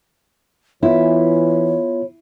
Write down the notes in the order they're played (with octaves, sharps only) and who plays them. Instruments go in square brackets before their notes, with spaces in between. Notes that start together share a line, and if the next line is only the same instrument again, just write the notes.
[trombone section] E3 [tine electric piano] B3 F4 [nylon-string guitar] E4 [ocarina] C#5